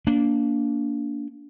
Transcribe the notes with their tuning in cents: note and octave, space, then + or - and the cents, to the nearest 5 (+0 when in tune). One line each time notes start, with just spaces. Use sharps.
A#3 +0 D4 -25